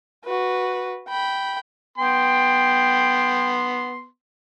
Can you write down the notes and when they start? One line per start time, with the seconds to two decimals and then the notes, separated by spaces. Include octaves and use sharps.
0.25 F#4 B4
1.08 G5 B5
1.98 B3 G5 C6